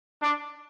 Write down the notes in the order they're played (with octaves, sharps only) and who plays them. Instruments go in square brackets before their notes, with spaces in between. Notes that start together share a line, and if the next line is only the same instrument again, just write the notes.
[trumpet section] D4